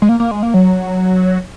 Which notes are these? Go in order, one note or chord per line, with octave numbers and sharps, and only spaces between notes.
G#3
A#3
A#3
G#3
A#3
F#3